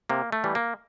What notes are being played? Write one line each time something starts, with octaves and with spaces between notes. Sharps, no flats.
C3 A#3
A3
E3 G3
A#3